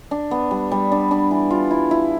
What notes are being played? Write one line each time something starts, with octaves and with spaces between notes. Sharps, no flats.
D4
B3
G3
G3
D4
D4
E3
F4
E4
E4